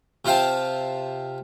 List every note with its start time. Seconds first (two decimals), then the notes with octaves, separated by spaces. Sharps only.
0.25 C3 F4 C5 F5 G5 A5